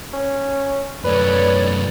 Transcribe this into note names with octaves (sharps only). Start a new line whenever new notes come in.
C#4
F#2 A3 B4 C#5 D5